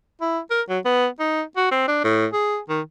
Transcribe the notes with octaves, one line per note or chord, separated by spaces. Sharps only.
E4
A#4
F#3
B3
D#4
F#4
C4
D4
A2
G#4
D#3